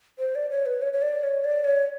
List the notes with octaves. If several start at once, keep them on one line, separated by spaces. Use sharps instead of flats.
C5
D5
C#5
B4
C#5
C#5
D5
C#5
D5
C#5